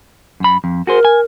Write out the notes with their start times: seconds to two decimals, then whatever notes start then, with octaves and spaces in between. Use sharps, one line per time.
0.40 F#2 B5
0.64 F2
0.87 F#4 G#4 A#4 C5
1.05 G#5